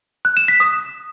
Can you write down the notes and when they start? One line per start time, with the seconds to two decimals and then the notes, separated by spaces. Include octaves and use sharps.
0.25 F#6
0.37 E7
0.48 B6
0.60 D#6